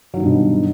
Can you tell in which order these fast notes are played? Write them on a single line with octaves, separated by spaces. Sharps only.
F#3 D#3 G2 G3 B2